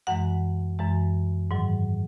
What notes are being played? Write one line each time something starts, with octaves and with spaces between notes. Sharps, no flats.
F#2 E3 G#3 F#5
F#2 E3 G#3
G#2 D#3 F#3